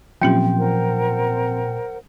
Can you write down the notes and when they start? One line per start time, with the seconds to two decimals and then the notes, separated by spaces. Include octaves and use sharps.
0.22 A#2 F3 F#3 C4 C#4 G4 G5
0.58 A#4 C5 F#5